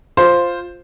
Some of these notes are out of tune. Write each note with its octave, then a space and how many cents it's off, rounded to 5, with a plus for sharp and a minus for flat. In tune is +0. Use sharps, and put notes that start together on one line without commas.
F4 +0 C5 +0